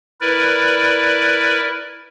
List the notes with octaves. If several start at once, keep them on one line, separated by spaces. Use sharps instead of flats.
E4 A#4 B4 D5